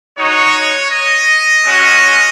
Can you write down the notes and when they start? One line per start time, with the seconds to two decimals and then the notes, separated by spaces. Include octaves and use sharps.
0.18 G#3 D#4 F#4 C#5
0.92 D#5
1.65 G#3 C#4 F#4